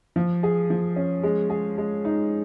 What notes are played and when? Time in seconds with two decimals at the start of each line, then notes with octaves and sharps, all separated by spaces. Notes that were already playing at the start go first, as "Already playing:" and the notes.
0.16 F3
0.43 G#4
0.70 F3
0.96 C#4
1.23 G#3
1.50 G#4
1.78 G#3
2.05 D#4